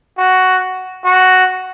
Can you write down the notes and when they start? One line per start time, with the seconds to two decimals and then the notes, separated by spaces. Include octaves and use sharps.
0.18 F#4
1.05 F#4